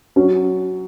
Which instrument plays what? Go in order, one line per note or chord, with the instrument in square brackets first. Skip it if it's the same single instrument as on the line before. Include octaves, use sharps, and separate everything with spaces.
[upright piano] F#3 C#4